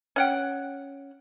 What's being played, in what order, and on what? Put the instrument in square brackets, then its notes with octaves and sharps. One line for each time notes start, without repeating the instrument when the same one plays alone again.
[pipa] C#4 F#5 G5